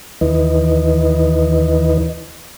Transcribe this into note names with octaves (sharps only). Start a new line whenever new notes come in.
D#2 D#3 E3 E4 B4 D#5